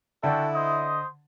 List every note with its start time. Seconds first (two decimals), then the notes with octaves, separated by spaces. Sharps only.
0.24 D3 E4 F#4 A4 D5 G5
0.55 C5 D#5 D#6